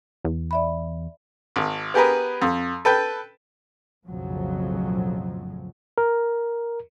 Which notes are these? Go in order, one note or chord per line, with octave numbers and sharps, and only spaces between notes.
E2
D5 E5 B5
G#1
B3 G4 G#4 A#4 B4
F2
A4 B4 G5
B1 F2 A2 C#3 F3 F#3
A#4